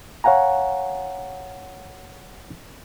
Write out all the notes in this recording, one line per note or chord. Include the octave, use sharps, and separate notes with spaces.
C#5 F5 F#5 G#5 A#5